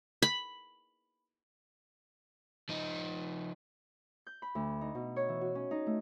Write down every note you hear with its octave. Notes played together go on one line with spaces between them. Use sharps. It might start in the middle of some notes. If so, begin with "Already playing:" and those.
B5
F3 D#4
G6
B5
D2
D#4
B2
C#5
E3
F#4
C#4
D#4
A3